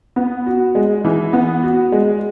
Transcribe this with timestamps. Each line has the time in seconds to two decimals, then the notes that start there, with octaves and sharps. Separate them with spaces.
0.16 B3
0.46 F#4
0.75 G#3
1.05 E3
1.33 B3
1.63 F#4
1.92 G#3